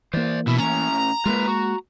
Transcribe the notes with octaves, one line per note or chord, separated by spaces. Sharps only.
E3 A#3 C5 D5
B2 E4
A2 C#4 A#5
G#3 A#3 F4 A#4 B4
F#4